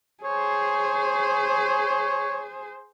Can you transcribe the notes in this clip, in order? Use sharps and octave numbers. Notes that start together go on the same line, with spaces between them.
G#4 C5 C#5